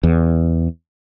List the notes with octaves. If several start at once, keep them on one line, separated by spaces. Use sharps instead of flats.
E2